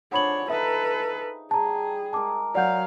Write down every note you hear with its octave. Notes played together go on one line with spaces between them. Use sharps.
D3 F3 D4 G#4 C#5 F#5 B5 F#7
D#4 A4 B4 E5
G3 G#4 A5 A#5 C6
G#3 A#4 A5 D6
F#3 A#4 D5 F5 F#5 G6